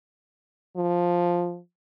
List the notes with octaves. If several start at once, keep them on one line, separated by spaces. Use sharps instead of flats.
F3